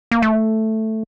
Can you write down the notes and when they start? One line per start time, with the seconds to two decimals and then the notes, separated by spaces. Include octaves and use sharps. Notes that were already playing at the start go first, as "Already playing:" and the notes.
0.11 A#3
0.22 A3